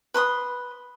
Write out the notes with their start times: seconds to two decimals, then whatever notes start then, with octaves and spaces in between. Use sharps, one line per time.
0.14 B4 C6 D#6